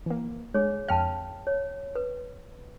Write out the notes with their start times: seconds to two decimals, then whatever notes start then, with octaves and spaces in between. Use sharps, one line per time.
0.06 E3 A#3
0.54 G#3 D4 G#4 C#5
0.88 F2 F5 G5 A5 F6
1.47 C#5
1.95 B4